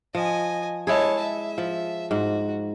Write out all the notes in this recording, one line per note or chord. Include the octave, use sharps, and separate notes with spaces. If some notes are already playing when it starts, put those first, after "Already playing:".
F3 D#5 G#5
G#3 E4 G#4 C#5 A5
E5
F3
G#2 F#4